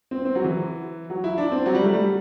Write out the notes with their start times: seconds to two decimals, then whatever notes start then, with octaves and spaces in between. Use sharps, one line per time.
0.11 C4
0.25 C4
0.35 F#3
0.44 E3
1.10 F#3
1.24 E4
1.38 D4
1.52 C4
1.66 F#3
1.74 G3
1.84 A3
1.94 G3